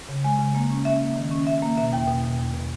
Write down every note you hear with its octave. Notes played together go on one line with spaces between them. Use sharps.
C#3
G#3 G#5
C#3
A#3
C#4
C#4 E5
A#3
D#3
C#4
C#4 E5
A#3
B2 E5
E2 G5
B2
B2
E2
B2